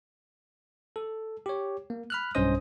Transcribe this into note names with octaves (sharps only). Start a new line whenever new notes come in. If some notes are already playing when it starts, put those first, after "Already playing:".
A4
G4 C#5
A#3
B5 F6 F#6
B1 G2 C#4 C5 D#5 D#6